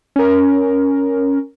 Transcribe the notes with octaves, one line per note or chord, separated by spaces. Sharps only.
C#4 A#4